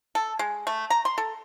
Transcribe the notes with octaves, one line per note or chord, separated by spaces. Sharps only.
A4
G#3
A3
A#5
C6
A4